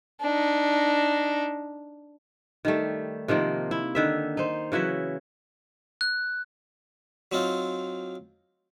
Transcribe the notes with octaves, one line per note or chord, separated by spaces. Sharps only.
D4 D#4
D#3 G3 A3
C3 D#3 F3 A#3
E4
D3 D#3 E5
D#4 C5
C#3 E3 F#3 E5
F#6
F#3 C4 D#4 F4